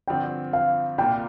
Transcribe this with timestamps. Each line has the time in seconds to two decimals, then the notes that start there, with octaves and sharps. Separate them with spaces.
0.08 G2 D3 F3 C4 G5
0.53 F5
0.98 C2 A#2 A#3 D4 F4 G5